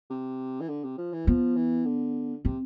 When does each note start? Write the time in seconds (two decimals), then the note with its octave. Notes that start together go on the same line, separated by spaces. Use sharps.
0.10 C3
0.61 E3
0.69 D3
0.84 C3
0.98 F3
1.13 E3
1.27 F3 B3
1.56 E3
1.86 D3
2.44 C3 C4